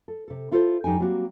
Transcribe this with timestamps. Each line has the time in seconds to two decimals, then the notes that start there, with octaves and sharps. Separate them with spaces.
0.08 A4
0.28 C3 A4
0.51 E4 F4 A4 A#4 C5
0.84 F#2 G3 D#4 G5 G#5
0.99 F#3 G3 A#3 C4 F#4